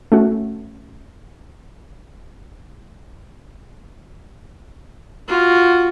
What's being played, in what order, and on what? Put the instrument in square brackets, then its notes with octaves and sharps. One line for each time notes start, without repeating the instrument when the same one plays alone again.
[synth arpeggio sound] A3 C#4 F#4
[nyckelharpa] F4 F#4